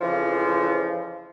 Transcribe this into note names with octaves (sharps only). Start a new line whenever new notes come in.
F2 C#3 E3 F3